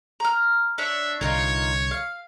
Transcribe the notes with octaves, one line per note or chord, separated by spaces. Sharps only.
A#5 F6
D4 C#5 E5
C2 D3 D#4 F4 A#4 C#5
F5